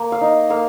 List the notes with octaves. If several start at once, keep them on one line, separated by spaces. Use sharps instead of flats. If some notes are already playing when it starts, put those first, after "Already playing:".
Already playing: A#3
F5
D#4
A#3 F5